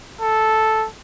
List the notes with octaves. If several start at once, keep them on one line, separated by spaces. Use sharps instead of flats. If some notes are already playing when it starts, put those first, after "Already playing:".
A4